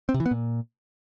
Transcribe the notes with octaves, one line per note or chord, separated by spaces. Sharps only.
C4
C3
E3
B3
A#2